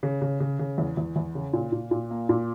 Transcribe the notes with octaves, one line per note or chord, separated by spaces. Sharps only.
C#3
C#3
C#3
C#3
E2
E2
E2
C#3
A#2
A#2
A#2
A#3
A#2